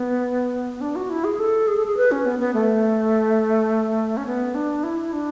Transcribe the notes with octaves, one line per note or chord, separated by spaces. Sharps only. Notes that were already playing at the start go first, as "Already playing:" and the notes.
Already playing: B3
D4
F#4
E4
G#4
A4
G#4
A4
G#4
B4
C#4
B3
B3
A3
C#4
B3
D4
E4
D4